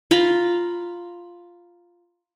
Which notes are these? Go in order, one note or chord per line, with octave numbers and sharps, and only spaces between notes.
F4 A#5 B5